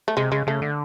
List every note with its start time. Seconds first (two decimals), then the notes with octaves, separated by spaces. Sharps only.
0.08 A3
0.17 C3 G#3
0.32 C#3 G#3
0.47 C#3 A3
0.62 D3